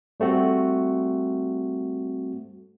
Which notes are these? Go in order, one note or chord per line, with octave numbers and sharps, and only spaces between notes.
G3 A3 C4 F#4